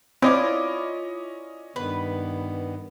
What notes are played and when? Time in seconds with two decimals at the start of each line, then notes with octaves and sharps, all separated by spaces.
0.22 C4 C#4 E4 F4 D5 D#5 D6
1.76 G2 D#3 B3 B4